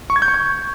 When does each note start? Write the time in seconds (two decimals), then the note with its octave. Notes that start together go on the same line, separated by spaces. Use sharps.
0.10 C#6
0.16 G#6
0.22 G6
0.28 C#6
0.34 G6